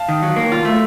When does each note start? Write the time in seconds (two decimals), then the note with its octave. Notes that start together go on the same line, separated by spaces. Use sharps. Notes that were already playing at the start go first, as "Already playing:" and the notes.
Already playing: F5 A5
0.09 D#3
0.23 F#3
0.36 A#3
0.52 F4
0.65 A3